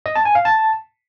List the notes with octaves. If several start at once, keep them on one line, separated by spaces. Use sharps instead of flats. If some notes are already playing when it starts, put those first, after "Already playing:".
D#5
A5
G#5
F5
A5